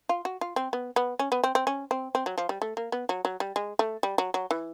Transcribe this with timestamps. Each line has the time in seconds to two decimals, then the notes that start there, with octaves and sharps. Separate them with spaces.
0.09 F4
0.25 F#4
0.41 F4
0.56 C4
0.73 B3
0.96 B3
1.19 C#4
1.32 B3
1.44 C4
1.55 C4
1.67 C#4
1.91 C4
2.15 C4
2.26 F#3
2.38 F3
2.49 G3
2.62 A3
2.77 A#3
2.92 B3
3.09 F#3
3.25 F#3
3.40 G3
3.56 G#3
3.79 A3
4.03 G3
4.18 F#3
4.34 F#3
4.51 E3